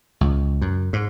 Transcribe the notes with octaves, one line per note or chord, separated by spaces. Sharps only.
C#2
F#2
G#2